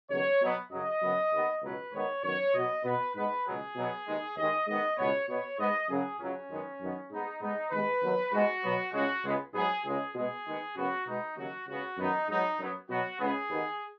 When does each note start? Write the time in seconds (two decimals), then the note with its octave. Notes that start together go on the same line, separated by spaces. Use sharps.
0.10 D#2 C#3 F#3 B3 C#5
0.41 B2 F#3 B3
0.71 F#2 C#3 F#3 D#5
1.02 F#2 C#3 B3
1.32 D#2 D#3 B3
1.62 C#2 B2 F#3 B4
1.92 G#2 D#3 B3 C#5
2.24 F#2 D#3 F#3 B3 C#5
2.54 B2 F#3 B3 D#5
2.84 B2 B3 B4
3.14 G#2 G#3 B3 B4
3.45 C#2 B2 F#3 B3 G#4
3.75 B2 F#3 B3
4.07 D#2 D#3 G#3 B3
4.36 D#2 D#3 G#3 D#5
4.67 G#2 D#3 B3 D#5
4.97 C#2 B2 B3 C#5
5.28 B2 B3 C#5
5.58 G#2 G#3 B3 D#5
5.89 F#2 C#3 F#3 G#4
6.19 C#2 C#3 F#3 C#4
6.50 F#2 D#3 G#3 B3
6.80 F#2 D#3 B3
7.10 G#2 G#3 B3 D#4
7.41 G#2 G#3 B3 D#4
7.71 D#2 D#3 G#3 B3 B4
8.02 D#2 D#3 F#3 B3
8.32 G#2 G#3 B3 F#4
8.63 B2 F#3 B3
8.93 C#2 C#3 G#3 F#4
9.24 C#2 C#3 G#3 B3
9.54 G#2 F#3 B3 G#4
9.85 C#2 C#3 G#3 G#4
10.15 B2 G#3 B3 G#4
10.45 D#2 D#3 G#3 B3
10.75 F#2 C#3 B3 F#4
11.06 B2 G#3 B3 D#4
11.36 D#2 C#3 F#3 F#4
11.67 C#2 C#3 B3 F#4
11.97 F#2 D#3 B3 D#4
12.28 G#2 F#3 B3 D#4
12.59 F#2 F#3 B3
12.89 B2 F#3 B3 F#4
13.20 C#2 C#3 B3 G#4
13.49 D#2 D#3 B3